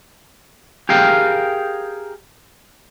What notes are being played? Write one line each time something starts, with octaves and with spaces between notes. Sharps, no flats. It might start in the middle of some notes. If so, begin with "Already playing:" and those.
G4 G#4 A#4 F5 G5